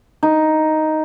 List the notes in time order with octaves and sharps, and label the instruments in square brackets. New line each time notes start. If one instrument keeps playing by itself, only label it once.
[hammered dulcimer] D#4